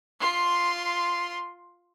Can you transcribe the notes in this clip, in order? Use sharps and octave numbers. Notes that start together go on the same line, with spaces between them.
F4 C6